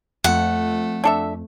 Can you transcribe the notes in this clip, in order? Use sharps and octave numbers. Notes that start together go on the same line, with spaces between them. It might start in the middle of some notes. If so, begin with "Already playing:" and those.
F2 A3 F#5
D4 A4 E5